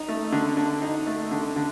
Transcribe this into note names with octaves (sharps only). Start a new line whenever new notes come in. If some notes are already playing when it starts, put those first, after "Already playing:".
Already playing: D#4
A3
D3
D3
D#4
A3
D3
D3